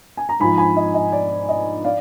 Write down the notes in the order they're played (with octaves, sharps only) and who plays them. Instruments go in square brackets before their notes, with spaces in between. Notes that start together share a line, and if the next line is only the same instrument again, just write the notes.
[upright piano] G#5
A#5
G#2 F3 G#5 B5
G#5 B5
D#5
D#5
D5
D#5
D5 F5